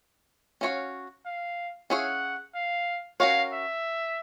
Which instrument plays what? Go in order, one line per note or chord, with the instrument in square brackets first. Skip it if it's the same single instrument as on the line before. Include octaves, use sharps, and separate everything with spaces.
[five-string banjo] C#4 F#4 A#4 C#5 F5
[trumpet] F5
[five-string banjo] C#4 E4 G#4 C#5 F5 [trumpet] F#5
[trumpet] F5
[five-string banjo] C#4 F#4 A#4 C#5 [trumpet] F5
[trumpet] E5